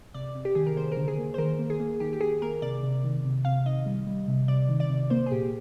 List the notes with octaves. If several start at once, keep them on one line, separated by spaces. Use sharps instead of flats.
C3 D5
C3
G4
D#3 G#4
A#4
A#3 C5
A#4
D3
G#4
A#3
C5
D#3 A#4
A#3
G#4
A#3
D#3 G4
G4
D#3 G#4
A#3 A#4
C3 D5
C3
D#3
C3
C3 F5
D#3 D#5
G3
G3
C3
C3 D5
D#3
D5
C3
A#3 C5
G#4
A#2 G4